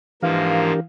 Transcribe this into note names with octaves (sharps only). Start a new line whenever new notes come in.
G#2 E3 F3 A#3 D4 G4 A#4 F5